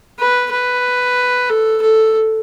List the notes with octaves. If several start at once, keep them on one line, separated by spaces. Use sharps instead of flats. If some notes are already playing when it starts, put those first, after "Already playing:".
B4
B4
A4
A4